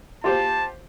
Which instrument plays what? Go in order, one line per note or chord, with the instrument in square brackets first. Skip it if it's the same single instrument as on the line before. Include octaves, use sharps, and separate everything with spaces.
[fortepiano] F4 G4 C5 [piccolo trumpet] A5